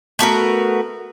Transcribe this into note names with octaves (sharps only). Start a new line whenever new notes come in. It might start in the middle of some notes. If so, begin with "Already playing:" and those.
A3 B3 F#4 A#4